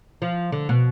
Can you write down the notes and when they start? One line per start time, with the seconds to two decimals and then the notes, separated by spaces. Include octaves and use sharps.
0.22 F3
0.52 D3
0.69 B2